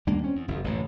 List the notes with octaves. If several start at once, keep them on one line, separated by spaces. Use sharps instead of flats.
D#2 G3 A#3 D4
C4 C#4
E2
F#1 E2
A1 F#2 D3